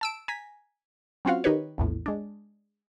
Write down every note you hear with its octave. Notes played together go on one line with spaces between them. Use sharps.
A5 E6 D7
G#5 A#5 B6
F#3 C4 C#4 F4 F#4 F5
D#3 D#4 G4 B4 C#5
A#1 E2 A2
G#3 D4